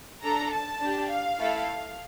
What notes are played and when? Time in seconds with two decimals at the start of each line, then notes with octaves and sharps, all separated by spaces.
0.24 D4 A4 A#5
0.52 A5
0.82 D4 G4
1.11 F5
1.39 A3 E4 A4